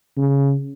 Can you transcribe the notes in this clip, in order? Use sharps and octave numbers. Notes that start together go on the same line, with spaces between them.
C#3